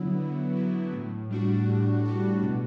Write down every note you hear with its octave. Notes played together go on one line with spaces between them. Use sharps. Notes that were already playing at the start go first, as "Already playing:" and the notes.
Already playing: D3 F#3 B3 E4
D3
F#3 B3 E4
A2
G3 D4 F#4
A2
G3 D4 F#4
B2